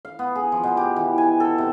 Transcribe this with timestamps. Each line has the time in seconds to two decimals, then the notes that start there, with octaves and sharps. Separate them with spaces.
0.05 F5
0.19 B3
0.36 G#4
0.52 F3
0.64 B2
0.77 G4
0.96 E3
1.18 G#5
1.40 A4
1.58 C3